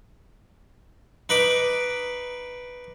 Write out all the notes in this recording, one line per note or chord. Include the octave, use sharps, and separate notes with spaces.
D#4 B4 B5 D6